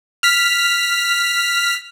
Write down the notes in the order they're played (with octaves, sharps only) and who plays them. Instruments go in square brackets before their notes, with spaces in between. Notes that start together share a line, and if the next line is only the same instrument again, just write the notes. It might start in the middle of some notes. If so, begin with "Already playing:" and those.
[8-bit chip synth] F6 B6